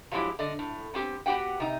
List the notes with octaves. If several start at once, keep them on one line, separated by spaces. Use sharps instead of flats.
F3 F#3 G#3 D#4 E4 G4
D3 D5 D#5
A2
B3 C4 G4
B3 F#4 G4 F#5 G5
C3 D#4